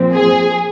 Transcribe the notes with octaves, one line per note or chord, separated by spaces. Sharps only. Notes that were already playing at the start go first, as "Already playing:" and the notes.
Already playing: A#2 F3 C4
G#4